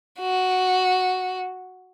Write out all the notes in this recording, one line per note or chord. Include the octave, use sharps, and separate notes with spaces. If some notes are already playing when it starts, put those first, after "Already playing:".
F#4